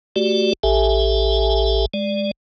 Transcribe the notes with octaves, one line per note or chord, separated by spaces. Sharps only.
A3 F#4 G4 D5
A1 G4 A4 E5 G#5
G#3 D5